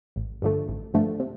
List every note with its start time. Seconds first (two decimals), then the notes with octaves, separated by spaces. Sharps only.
0.16 A1
0.42 G2 D3 F3 A3
0.68 A1
0.94 G2 D3 F3 A3
1.20 C3